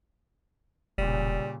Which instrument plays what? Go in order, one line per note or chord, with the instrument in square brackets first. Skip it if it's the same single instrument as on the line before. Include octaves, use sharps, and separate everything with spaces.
[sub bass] E1 [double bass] A#2 C#3 [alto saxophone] G3